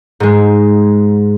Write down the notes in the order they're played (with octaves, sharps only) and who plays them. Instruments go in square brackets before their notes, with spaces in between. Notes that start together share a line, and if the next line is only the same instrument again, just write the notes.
[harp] G#2 G#3